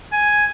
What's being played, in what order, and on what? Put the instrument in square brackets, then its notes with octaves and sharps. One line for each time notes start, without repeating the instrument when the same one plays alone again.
[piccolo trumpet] G#5